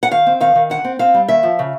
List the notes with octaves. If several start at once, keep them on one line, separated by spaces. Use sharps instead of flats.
F#5
D#3 F5
C4
D#3 F5
D#3
D3 F#5
C4
C4 F5
G3
D#2 E5
F3
C#3